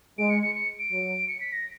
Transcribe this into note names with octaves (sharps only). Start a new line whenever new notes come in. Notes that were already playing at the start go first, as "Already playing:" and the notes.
G#3 D7
C#7
C#7
C#7
D7
F#3
C#7
B6
A#6